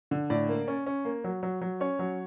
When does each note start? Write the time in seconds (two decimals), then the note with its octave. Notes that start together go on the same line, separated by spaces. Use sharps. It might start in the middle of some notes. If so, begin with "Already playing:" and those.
0.11 D3
0.30 A2 D5
0.49 A#3
0.68 C#4
0.86 C#4
1.05 A#3
1.24 F#3
1.43 F#3
1.61 F#3
1.80 C#4 C#5
1.99 F#3